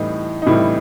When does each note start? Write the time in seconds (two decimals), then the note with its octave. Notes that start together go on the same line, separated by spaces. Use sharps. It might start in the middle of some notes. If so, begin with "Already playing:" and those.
Already playing: A2 E3 G3 D#4
0.42 D#4
0.46 A2 E3 G3 E4